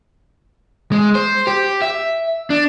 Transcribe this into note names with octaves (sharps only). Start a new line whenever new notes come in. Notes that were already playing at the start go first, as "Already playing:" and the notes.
G#3
C5
G4
E5
D4